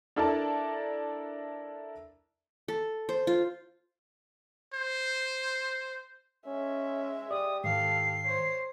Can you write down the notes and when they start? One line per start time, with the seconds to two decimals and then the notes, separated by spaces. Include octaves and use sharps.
0.16 D4 E4 A4 A#4 D5 A5
2.68 A4
3.09 C5
3.27 F4
4.74 C5
6.47 G#3 C#4 E5
7.31 G4 D5 D#6
7.64 G#2 D#3 A4 F5 C7
8.25 C5 C#5